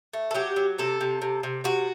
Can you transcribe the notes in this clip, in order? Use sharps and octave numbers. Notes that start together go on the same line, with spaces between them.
A3
A4
F#3 G4
F#3
C3 A4
C3
C3
C3
C3 F#4